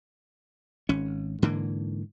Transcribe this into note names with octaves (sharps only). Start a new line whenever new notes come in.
G#1 C#4
G#2 D3 E3 A#3